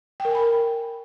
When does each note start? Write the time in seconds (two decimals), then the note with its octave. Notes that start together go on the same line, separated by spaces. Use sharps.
0.20 G5
0.25 A#4
0.30 G#5
0.35 B5
0.40 A#4